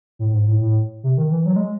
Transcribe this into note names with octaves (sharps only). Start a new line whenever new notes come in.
A2
G#2
A2
A2
C3
D#3
E3
F#3
G#3